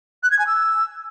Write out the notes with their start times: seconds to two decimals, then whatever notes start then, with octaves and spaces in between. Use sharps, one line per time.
0.23 F#6
0.31 G#6
0.39 G#5
0.47 E6